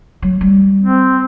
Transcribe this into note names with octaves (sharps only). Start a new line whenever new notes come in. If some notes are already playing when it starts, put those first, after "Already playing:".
F#3
G3
C4